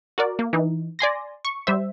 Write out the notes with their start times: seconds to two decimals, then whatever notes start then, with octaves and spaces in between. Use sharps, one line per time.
0.18 F#4 A#4 D5
0.39 A#3
0.53 E3 D#4
0.99 D5 G#5 C6 A#6
1.45 C#6
1.67 G3 C5 E5